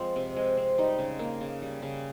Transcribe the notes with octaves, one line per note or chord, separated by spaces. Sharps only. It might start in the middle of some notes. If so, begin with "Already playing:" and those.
Already playing: F3 G#3 C4
C3
G#3
C4
G3 D#4
C#3
A#3
C#3
G3
C#3